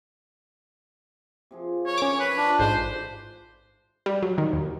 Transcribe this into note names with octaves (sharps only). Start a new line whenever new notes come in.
C3 F3 G#4
A#4 C#5
C#4 D6
B4
D4 E4 F4
A1 G#2 C5
G3
F#3
D#3
D#2